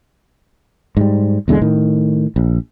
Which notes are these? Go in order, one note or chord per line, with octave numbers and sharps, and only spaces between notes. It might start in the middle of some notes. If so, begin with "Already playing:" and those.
G#2 G3
B1 E2 D3 G#3
A2 D#3
A#1